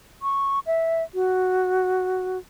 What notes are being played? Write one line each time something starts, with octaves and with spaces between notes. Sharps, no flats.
C#6
E5
F#4